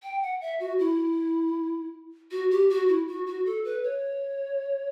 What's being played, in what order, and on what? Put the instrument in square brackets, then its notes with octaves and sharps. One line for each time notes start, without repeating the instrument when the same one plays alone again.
[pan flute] G5
F#5
E5
F#4
E4
F#4
G4
F#4
E4
F#4
F#4
A4
B4
C#5